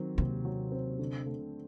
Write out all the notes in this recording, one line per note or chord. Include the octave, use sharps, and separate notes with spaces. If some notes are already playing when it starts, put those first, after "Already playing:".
Already playing: D#3 F#3 C4
D#2 C3
F#3
C4
D3
A3